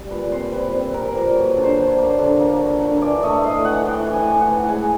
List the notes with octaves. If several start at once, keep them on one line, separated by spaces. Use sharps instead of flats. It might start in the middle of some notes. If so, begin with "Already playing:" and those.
Already playing: G3
A#2 B4
C4 C5
A#2 B4
C4
C4 A#4
A#2
F#3 B4
D3
C5
F#3
A#3
D3
A#3
F#3
D3
E3 D5
A3 D#5
A2 F5
E3 F#5
A2 G5
E3
G#5
A2
F#5
E3
G#3 G#5